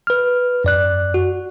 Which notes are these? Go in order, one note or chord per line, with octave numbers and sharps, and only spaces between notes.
B4 F6
F#2 D5 F#6
F#4